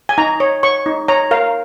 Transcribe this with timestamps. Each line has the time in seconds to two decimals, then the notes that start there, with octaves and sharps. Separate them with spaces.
0.09 G#5
0.18 D#4 A#5
0.40 C#5
0.63 C#5 C#6
0.86 D#4
1.08 C#5 A#5
1.31 A#4 F5